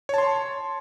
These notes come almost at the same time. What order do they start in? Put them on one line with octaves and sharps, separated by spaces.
C#5 A5 C6